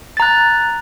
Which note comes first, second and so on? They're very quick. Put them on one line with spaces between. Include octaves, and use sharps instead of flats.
A6 A#5 F#6